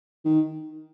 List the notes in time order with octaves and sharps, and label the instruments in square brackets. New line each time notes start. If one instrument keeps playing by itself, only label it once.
[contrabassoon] D#3